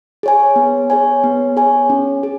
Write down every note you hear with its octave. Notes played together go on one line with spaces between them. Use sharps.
G#4 C#5 G#5
B3
G#4 C#5 G#5
B3
G#4 C#5 G#5
C#4
G#4